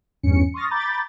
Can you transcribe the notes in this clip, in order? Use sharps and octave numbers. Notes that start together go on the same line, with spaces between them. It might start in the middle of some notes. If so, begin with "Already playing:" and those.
G#1 E2 G2 C#4 C#7
C6 C#6 D#6 F6 A6 A#6
A#5 B5 D6 G6 A6